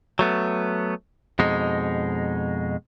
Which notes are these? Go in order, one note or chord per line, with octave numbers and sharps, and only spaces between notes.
F#3 A3 B3
F2 B2 G#3 D#4